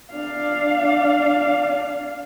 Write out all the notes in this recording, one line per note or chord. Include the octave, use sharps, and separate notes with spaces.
D4 F5